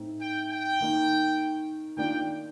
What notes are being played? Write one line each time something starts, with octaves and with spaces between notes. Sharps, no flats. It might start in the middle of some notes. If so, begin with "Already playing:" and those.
Already playing: A2 A3 C4 D#4
G5
G5
D#3 A#3 D#4
D#3 A#3 D4 F4 G5